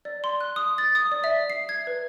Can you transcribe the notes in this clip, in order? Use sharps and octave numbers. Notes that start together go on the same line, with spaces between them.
D5
C6
F#6
D#6
A6
D#6
D5
E5
C7
G#6
B4